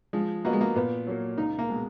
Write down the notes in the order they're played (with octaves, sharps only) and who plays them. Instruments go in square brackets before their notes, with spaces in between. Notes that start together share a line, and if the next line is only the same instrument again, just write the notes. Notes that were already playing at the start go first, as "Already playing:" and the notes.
[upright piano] F3 [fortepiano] G#3
[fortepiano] A#3 [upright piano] B3 F#4 B4 D#5
[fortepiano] G#3
A#3
[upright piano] A#2 [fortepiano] B3
[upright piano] F#3 A#3
[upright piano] C#2 [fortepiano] D#4
[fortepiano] A#3
[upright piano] B2 G#3